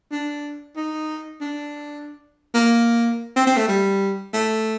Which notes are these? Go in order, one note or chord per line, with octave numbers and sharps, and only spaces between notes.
D4
D#4
D4
A#3
C4
C4
A3
G3
A3